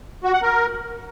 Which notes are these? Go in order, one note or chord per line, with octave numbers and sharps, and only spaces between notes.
F#4
F#5
A#4